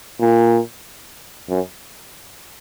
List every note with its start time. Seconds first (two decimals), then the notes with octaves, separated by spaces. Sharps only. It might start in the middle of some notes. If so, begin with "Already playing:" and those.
0.21 A#2
1.49 F#2